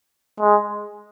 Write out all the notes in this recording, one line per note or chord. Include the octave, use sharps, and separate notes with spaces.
G#3